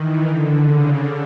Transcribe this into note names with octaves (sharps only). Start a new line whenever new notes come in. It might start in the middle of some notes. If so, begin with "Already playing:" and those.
Already playing: D#3 E3
D3
C#3